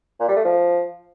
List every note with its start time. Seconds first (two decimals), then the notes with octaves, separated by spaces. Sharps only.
0.20 A#2
0.28 G3
0.36 A3
0.45 F3